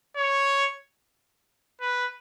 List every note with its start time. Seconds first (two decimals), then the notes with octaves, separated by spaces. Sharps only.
0.16 C#5
1.81 B4